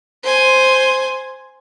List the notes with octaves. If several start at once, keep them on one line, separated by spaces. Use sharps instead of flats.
C5 G#5